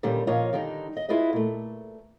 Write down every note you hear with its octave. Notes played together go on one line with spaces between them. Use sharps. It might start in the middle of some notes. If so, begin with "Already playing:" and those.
A#2 D3 D#3 G3 C#4
A#2 F3 F4 C#5 D#5
D3 D#3 G3 D#4
D#5
E4 F4 G#4 B4 D#5
A#2 A3